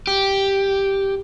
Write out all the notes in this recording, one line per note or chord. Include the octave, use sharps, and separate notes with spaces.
G4